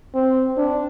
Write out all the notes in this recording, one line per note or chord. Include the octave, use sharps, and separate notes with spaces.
C4
D4